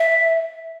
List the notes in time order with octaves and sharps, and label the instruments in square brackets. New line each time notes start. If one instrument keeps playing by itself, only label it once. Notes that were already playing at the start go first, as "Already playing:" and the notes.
Already playing: [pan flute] E5